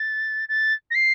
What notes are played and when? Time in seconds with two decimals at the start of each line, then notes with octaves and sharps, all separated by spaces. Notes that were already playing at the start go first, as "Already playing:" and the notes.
Already playing: A6
0.49 A6
0.91 A#6
0.95 C7